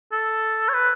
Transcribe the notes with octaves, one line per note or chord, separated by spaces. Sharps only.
A4
C#5
B4